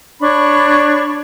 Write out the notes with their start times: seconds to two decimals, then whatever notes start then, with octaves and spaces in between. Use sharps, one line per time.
0.21 D4 C#5 B5 C#6